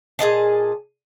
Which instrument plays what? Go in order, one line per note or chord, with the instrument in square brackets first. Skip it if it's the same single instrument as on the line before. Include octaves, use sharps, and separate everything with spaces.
[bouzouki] A#2 G#4 D#5 A5